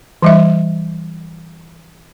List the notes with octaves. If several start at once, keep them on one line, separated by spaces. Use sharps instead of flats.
E3 G3 E5